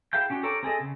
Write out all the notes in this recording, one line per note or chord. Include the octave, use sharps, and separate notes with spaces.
E4 G#4 F5 G5 G6
C#4 D4 F#4 G4
G4 A4 A#4 C#5 D5
C4 G#4 A4 D#5
C#3